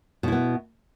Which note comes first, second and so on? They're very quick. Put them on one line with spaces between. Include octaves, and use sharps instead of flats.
B2 E4 B3